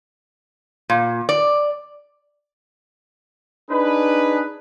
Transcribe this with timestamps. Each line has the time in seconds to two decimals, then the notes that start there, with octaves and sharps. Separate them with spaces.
0.90 A#2
1.29 D5
3.71 D4 D#4 G#4 B4